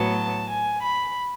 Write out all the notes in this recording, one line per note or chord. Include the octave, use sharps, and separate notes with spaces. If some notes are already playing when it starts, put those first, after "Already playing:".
Already playing: A2 F#3 B3 A5
G#5
B5